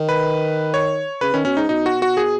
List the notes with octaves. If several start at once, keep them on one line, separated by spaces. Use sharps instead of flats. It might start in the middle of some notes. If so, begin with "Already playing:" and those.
Already playing: D#3
B4
C#5
C#3 B4
D#3 C#4
B2 C#4
G#2 D#4
B2 D#4
F#4
F#4
G#4